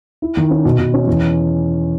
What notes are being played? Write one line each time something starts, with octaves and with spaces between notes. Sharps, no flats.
E4
D#3
C#4
B2
B2
C#4
E2